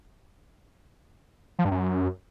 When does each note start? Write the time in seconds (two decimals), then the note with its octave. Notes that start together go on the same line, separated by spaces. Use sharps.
1.59 F3
1.65 G2
1.71 F#2